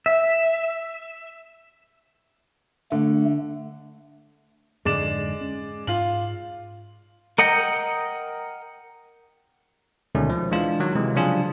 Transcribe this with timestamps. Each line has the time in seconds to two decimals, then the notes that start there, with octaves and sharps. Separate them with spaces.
0.06 E5
2.92 D3 A3
4.85 F2 G#2 D3 G#3 D5 E7
5.41 C#4
5.87 G#2 F4 F#7
7.38 A#4 D#5 F#5 G5 A#5
10.15 D2 B2 D#3 G#3 A3 C#4
10.30 F3
10.51 E3 G#3 D4 F4
10.80 D#3 F#3
10.95 C3 E3 G#3
11.15 C#3 F3 F#3 D4 F4 G#4